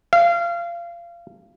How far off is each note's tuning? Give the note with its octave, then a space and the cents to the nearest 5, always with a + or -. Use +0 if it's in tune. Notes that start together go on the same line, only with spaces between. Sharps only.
F5 -25